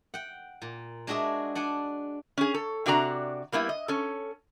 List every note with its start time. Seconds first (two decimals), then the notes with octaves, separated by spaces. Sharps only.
0.14 F#5 G5
0.62 A#2
1.07 G#3 D4 F#4 G#4 E5
1.55 D4 F#5 G#5
2.38 C#4 G#4
2.54 A4
2.86 C3 D4 F#4 D5 G#5 A#5
3.52 G3 A#3 B3 E4
3.69 D#5
3.88 C#4 A4